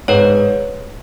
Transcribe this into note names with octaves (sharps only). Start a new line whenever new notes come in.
G#2 B4 C#5